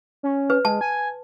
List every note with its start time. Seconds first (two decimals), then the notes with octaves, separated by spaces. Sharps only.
0.23 C#4
0.50 B4
0.65 G#3 A5
0.81 G#5